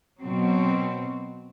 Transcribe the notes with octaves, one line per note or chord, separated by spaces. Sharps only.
B2 F#3 C4